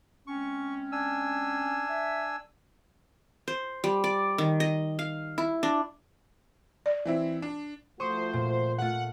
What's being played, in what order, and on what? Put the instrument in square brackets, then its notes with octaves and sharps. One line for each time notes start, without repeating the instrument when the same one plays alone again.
[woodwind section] G#3 C4 C#4 [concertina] C#6
[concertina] D4 G#5 E6
[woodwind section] E5
[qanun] C5
G3
D5
D#3
D#5
F5
E4
D4
[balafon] D5
[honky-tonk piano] E3 C4 E4
D4
[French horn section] F3 A3 F#4 [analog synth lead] C5 [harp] C#6 D#6
[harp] A#2
[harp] A3 F4 [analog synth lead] F#5